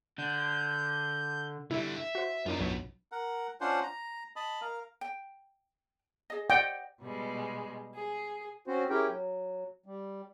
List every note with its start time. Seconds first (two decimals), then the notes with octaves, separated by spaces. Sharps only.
0.18 D3 G6
1.71 D3 G3 E4
1.96 E5
2.15 F#4 C5
2.46 F#2 B3 D4 D#4 F4
2.60 B1 F#3
3.12 A#4 F#5
3.61 C#4 D4 F4 C5 F#5
3.83 A#5
4.36 D#5 A5 B5
4.61 A#4 F5
5.01 G5
6.30 G#4 D#5
6.50 D5 D#5 F#5 G5
7.01 B2 G3 G#3
7.95 G#4
8.67 C4 C#4 F#4 C5
8.90 C#4 E4 G4 G#4 A#4 G5
9.09 F#3
9.86 G3